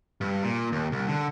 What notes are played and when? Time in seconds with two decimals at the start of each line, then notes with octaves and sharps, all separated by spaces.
0.21 G2
0.43 A#2
0.72 D#2
0.92 C2
1.08 D3